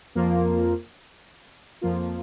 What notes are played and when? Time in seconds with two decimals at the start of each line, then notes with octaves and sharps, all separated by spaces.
0.15 F2 F3 A#3 F4
1.81 F2 F3 A#3 F4